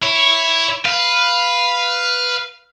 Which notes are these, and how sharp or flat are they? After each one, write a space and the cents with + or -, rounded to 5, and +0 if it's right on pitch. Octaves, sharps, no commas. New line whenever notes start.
E4 +0 C#5 +0
B4 +0 F5 +0